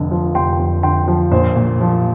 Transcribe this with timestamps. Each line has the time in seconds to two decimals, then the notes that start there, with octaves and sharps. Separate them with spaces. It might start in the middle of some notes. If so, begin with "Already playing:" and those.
Already playing: F1 F2 D3
0.11 F3
0.35 F1 G5 C6
0.59 F2
0.83 D3 G5 C6
1.08 F3
1.31 A#1 C5
1.56 A#2
1.81 F3